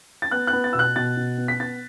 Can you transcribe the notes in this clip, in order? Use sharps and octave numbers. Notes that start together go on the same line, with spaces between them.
A6
B3 F#6
F#6
B3
A6
B2 E6
F#6
B2 A6
B2
B3
B6
B3 A6